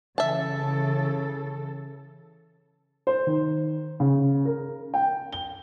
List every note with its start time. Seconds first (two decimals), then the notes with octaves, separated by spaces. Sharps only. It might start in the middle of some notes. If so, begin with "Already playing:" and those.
0.18 C#3 E3 A4 E5 A5
3.07 C5
3.27 D#3
4.00 C#3
4.45 A#4
4.94 G5
5.32 G7